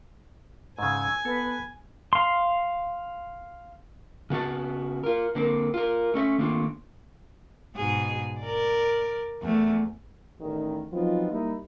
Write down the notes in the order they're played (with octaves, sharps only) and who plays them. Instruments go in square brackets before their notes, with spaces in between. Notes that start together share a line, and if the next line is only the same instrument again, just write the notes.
[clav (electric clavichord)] G#2 C#3 [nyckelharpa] G#5 [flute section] C#6 E6 G#6
[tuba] B3 [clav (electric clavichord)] A4 [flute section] B4
[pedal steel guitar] F5 C6
[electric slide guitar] C#3 B3 F#4 A5
F4 A#4
D3 A#3 C4
F4 A#4
A3 C#4 D#5 E5
D#3 A3 A#3 C4 D4 F4
[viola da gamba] G#2 B2 G#4
A#4 D5
E2 A3
[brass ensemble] A1 E2 D#3
F3 F#3 B3 C4 D#4 F4
G3 A#3 D#4 E4